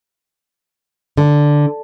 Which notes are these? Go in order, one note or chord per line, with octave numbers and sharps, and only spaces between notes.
D3